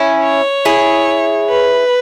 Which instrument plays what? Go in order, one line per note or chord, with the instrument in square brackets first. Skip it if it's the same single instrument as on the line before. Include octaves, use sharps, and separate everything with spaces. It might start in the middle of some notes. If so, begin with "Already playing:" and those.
Already playing: [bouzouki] C#4 E4
[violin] C#5
[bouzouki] E4 G#4
[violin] B4